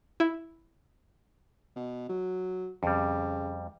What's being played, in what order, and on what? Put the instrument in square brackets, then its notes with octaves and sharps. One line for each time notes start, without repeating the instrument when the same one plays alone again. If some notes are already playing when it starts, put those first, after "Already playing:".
[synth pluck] E4
[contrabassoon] B2
F#3
[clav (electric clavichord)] F2 G3 [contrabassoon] C#3